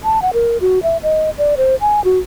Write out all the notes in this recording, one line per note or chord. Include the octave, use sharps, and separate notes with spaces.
A5
F#5
A#4
F#4
E5
D#5
D5
C5
G#5
F#4